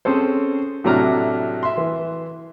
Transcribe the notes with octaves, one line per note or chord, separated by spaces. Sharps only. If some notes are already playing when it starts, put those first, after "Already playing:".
C4 C#4 G#4 A4 C5
A2 C3 F#3 D4 A#5 F6
E5 C6
E3